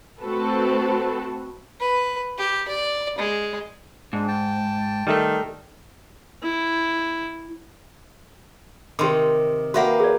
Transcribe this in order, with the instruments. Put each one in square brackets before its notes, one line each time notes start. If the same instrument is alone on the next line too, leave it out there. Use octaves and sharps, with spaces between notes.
[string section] A3 C4 F#4 A4 B4
[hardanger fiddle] B4
G4
D5
G#3
[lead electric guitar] G#2 [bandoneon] G#3 D4
[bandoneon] G5 A5
[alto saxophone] D#3 [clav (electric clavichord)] G3 A3 A4
[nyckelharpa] E4
[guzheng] C3 D#3 [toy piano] G4 C6 D6
[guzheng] A#3 G4 B4 [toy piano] F#4 E5 F#5
[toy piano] G#4 D5